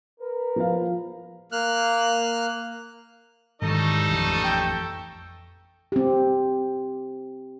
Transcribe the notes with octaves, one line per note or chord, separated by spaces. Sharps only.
A#4 B4
F3 F5
A#3 F6 F#6
G#2 D#3 E3 G3 D#4 A4 D#5 C#6
A1 F2
G5
C4 G4